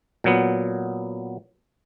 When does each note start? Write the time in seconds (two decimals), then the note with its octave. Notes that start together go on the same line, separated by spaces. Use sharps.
0.24 A#2 F#3 B3